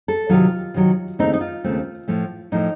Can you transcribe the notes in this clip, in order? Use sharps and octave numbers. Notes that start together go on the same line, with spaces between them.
A4
C3 D#3 F#3 F4
C3 D#3 F#3
D#2 C#3 A3 C4 D#4
D#4
F4
D#2 C#3 A3 C4
A2 F3 A3
A2 F3 A3 D#4